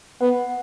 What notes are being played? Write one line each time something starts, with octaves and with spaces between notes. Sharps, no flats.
B3 F#5